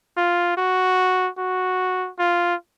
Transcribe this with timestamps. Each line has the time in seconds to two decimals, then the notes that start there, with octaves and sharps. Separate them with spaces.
0.17 F4
0.57 F#4
1.38 F#4
2.19 F4